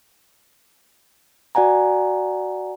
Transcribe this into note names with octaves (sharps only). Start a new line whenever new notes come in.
F#4 D5 F#5 G#5 A#5